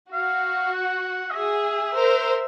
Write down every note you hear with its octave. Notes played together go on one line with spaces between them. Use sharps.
F#4 F5
F#5
D#5
G#4 E5
A#4 C5